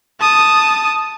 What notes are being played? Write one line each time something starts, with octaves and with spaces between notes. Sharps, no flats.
A5 D#6